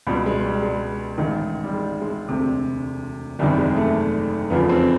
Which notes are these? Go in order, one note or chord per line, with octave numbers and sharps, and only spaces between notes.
C#2 B2 G3
G#3
G3
G#3
A1 G#2 D#3
G3
G#3
G#3
E1 D2 C3
F#1 E2 C3 D#3 G3
G#3
A3
F1 E2 C#3 F3 B3
C4